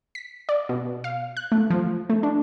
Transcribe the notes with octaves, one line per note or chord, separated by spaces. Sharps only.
B6
D5
B2
F5
F#6
A3
F3
A3
D4